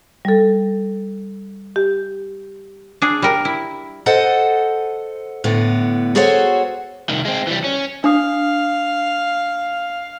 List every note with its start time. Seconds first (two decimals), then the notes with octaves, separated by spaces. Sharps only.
0.25 G3 A4
1.76 G4
3.02 D4 G#4
3.22 G3 A#4
3.45 E4
4.06 A4 C5 D#5 F#5 A5
5.44 A2 D3 B3
6.15 F#4 G#4 A4 C5 C#5 F#5
7.09 C2 D#3
7.25 G#3 C4
7.47 E3 G3
7.64 C#4
8.04 D4 F5 D#6